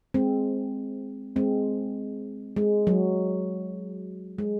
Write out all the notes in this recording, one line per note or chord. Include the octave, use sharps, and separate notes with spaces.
G#3 C4
G#3 C4
G#3
F#3
G#3